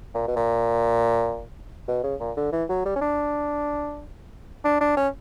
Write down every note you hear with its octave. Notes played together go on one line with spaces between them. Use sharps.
A#2
B2
A#2
B2
C#3
A#2
D3
E3
F#3
G3
C#4
D4
D4
D4
C#4